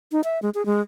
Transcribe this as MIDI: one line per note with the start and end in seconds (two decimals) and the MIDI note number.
0.12 0.21 63
0.24 0.39 76
0.42 0.50 56
0.54 0.65 68
0.66 0.81 56